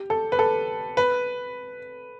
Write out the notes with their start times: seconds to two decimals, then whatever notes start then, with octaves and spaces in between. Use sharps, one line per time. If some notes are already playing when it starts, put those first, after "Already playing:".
Already playing: G4
0.10 A4
0.32 B4
0.39 A4
0.97 B4